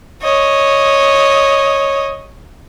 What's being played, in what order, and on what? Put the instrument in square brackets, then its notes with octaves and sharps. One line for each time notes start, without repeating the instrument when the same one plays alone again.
[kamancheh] C#5 D#5